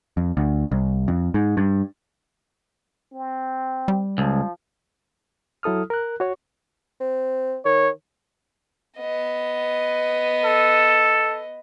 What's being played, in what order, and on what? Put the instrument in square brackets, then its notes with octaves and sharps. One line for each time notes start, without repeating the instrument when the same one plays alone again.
[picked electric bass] F2
D2
C2
F2
G#2
G2
[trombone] C4
[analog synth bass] G3
[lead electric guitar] C#2 [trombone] F3
[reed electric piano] F#3 E4 A4 D#6 F6
A#4 F#6
F#4 C#5 C#6
[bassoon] C4
[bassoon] D#3 [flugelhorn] C#5
[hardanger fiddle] B3 D#5
[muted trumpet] A4